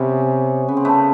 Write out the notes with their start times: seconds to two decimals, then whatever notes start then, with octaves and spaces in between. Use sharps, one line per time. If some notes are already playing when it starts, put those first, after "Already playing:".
Already playing: C3 B3 C#4
0.68 C#3 B3
0.77 C4
0.85 A3 B3